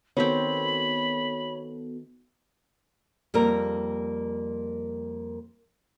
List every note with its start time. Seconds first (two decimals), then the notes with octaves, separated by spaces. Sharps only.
0.17 D#3 B3 C4 F#4 A4 C#5 B5
3.34 F2 G3 A#3 A#4